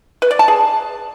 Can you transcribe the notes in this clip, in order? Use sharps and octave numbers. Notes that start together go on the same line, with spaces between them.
B4
D5
A5
G#4